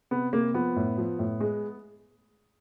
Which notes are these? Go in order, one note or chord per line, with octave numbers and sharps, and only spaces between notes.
C3 B3
C3 A#3
F3 B3
A2
F3
A2
G#3